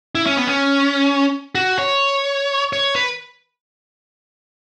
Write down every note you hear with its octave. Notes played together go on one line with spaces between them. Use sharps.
E4
C#4
B3
C#4
F#4
C#5
C#5
B4